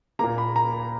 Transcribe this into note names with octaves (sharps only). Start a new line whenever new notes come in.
A#2 A#3 A#5
B5
A#5